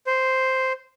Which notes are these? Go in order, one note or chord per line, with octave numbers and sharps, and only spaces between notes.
C5